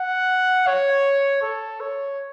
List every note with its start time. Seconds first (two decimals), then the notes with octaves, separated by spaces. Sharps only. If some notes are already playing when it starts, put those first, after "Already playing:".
Already playing: F#5
0.67 C#5
1.42 A4
1.80 C#5